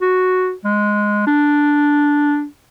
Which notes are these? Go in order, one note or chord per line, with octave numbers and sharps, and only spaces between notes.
F#4
G#3
D4